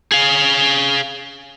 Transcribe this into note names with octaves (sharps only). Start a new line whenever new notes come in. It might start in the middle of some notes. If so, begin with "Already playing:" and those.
G#4 F5